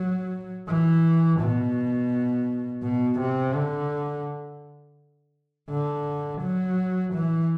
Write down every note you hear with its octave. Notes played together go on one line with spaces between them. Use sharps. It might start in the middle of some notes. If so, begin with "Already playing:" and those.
Already playing: F#3
E3
B2
B2
C3
D3
D3
F#3
E3